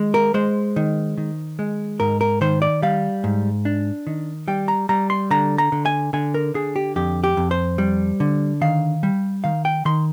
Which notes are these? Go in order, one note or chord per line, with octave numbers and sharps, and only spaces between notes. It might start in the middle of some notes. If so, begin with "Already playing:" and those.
Already playing: D#3 G#3
A#4
G#3 C5
D#3
D#3
G#3
G#2 A#4
A#4
D#3 C5
D5
G3 F5
G#2
D4
D#3
G3 G5
A#5
G3 A#5
C6
D3 A#5
A#5
D3
G#5
D3 G#5
A#4
D3 G#4
G4
F2 G4
G4
F2
C5
G3
D3
D#3 F5
G3
D#3 F5
G5
D#3 C6